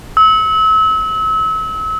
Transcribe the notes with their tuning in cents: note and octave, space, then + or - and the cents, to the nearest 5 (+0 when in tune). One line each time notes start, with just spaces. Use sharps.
E6 -35